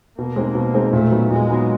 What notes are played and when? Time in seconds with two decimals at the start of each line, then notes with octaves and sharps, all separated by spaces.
0.18 B2 A#3
0.36 G#3 C4 D#4 G#4
0.55 B2
0.74 G#3 C4 D#4 G#4
0.93 A#2 A3
1.11 F#3 B3 D#4
1.30 A#2 G#3
1.50 F#3 B3 D#4